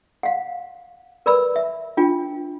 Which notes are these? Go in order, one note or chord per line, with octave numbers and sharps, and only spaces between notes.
F5 F#5
A#4 B4 D5 B5 E6
E5
D4 F4 G5